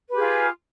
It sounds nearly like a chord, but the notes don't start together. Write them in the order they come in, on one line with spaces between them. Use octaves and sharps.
B4 G4 G#4 F4